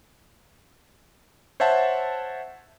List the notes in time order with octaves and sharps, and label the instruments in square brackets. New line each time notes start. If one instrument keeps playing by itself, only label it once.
[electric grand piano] C5 C#5 E5 F#5 A5